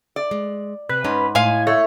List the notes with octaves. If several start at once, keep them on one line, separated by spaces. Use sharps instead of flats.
D5
G#3
C3 B4
G#2 C#4
A2 G#3 F5 G#5
A3 C#5